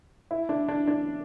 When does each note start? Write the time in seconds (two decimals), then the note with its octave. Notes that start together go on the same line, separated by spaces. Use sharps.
0.31 E4
0.49 D4
0.68 D4
0.87 D4